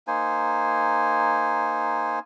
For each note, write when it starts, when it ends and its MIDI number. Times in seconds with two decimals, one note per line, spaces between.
0.07 2.19 58
0.07 2.19 63
0.07 2.19 72
0.07 2.19 80